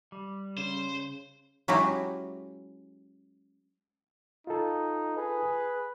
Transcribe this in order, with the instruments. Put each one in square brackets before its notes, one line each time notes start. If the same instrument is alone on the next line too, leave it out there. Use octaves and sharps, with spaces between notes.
[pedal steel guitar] G3
[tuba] C#3 [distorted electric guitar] C5
[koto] F#3 G#3 C#4 E4 F#4 G4
[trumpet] D#4 [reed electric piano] F4 A4
[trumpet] G#4 [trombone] B4